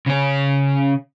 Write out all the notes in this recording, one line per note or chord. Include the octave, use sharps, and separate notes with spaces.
C#3 C#4